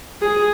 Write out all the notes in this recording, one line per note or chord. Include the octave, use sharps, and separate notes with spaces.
G#4